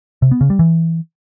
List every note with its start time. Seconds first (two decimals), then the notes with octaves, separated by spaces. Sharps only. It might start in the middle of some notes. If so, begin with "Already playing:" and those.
0.22 C3
0.31 B3
0.41 C#3
0.50 G3
0.59 E3